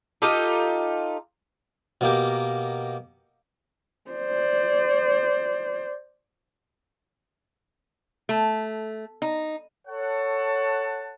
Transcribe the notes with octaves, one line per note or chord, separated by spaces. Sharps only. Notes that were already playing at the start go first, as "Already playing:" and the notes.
D#4 F4 G4 A4
B2 A#3 G4
C5 D5
A3
D#4
A4 C#5 F#5 A5